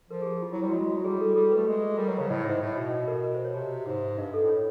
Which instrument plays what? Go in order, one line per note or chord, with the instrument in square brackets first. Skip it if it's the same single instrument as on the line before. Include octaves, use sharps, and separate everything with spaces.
[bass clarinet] F3 [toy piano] A#4
[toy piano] G#4
G4
F4
[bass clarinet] F#3 [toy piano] E4
[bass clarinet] G3 [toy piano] E4
[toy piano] F#4
[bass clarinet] G#3 [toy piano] F4
[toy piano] F#4
[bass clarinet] F#3
[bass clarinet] G3 [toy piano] G#4
[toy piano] A4
G#4
[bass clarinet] G3 [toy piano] A4
[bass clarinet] A3 [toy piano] B4
[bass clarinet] G#3 [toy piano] G4
[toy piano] G#4
[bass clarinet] G3 [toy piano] A#4
[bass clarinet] F#3 [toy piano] B4
[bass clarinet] C#3 [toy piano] C5
[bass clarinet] A2 [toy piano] D#5
[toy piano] D#5
[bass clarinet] G#2 [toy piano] E5
[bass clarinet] A2 [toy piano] D#5
[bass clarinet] B2 [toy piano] D#5
[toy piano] D#5
A#4
A#4
C5
C#5
[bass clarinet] C3
G#2
[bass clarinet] G2 [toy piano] D#5
[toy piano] A4
[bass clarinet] A2
[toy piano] C#5